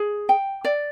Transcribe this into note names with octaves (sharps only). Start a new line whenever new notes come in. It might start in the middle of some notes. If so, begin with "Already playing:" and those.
Already playing: G#4
G5
D5